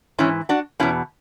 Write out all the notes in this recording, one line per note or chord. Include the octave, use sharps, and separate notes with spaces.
G#2 E3 C#4 E4
D4 F#4
E2 B2 C#4 E4